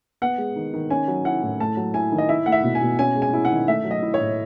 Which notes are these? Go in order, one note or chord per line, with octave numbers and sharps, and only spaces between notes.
B3 F#5
G#3
D#3
D#3
C#4 G#5
F#3
E4 F#5
A2
A3 A5
F#3
E4 G#5
D#3
D#5
E4 E5
A3 F#5
E5
B2
G#5
B2
C#4 G#5
G#3
G#5
E4
F#5
D#3
A3 E5
F#3
D#5
E4
C#5
A2